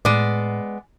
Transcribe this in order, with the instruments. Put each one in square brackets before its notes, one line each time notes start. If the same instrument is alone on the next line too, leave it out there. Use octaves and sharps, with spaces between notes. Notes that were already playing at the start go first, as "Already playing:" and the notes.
[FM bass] A2 [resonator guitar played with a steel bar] G#3 B3 D5